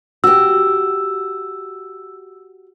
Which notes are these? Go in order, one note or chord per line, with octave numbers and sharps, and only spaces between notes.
F#4 G4 E6